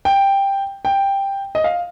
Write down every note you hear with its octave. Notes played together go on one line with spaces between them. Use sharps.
G5
G5
D#5
F5